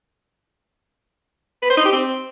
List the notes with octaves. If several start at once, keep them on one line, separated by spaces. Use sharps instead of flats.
B4
C5
D#4
G4
C4